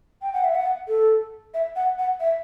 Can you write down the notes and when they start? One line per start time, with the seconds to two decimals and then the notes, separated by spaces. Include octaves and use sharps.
0.22 G5
0.33 F#5
0.44 E5
0.55 F#5
0.88 A4
1.54 E5
1.76 F#5
1.98 F#5
2.20 E5